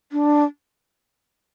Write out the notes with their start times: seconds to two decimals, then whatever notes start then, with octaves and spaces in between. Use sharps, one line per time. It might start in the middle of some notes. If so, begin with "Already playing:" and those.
0.12 D4